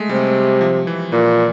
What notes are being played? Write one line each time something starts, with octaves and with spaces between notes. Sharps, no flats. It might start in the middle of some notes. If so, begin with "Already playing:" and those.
Already playing: G#3 A3
C3 G3
F3
E3
A#2 E3